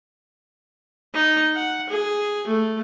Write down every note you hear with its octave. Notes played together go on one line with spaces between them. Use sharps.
D#4
F#5
G#4
A3